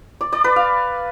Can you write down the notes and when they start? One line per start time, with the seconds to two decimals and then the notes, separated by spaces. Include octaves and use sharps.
0.21 D5
0.32 D5
0.44 B4
0.56 F5